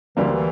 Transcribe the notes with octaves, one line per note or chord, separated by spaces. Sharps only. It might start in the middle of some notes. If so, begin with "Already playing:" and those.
D2 D3 E3 G3 A#3
F3
E3